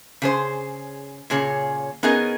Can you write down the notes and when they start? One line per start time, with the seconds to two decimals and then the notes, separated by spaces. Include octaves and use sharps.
0.22 C#3 G#4 C5
1.30 A#2 C#3 G#4 C#5
2.03 B3 C#4 D#4 G#4 A#4 D#5